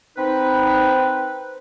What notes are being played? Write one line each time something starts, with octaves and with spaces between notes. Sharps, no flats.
C4 D#4 B4